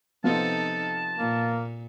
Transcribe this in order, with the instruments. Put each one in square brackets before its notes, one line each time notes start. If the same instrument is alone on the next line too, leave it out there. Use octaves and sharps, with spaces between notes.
[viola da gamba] C3 D#4 A4 [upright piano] F3 B3 F4 [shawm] A5
[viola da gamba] A#2 [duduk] A#3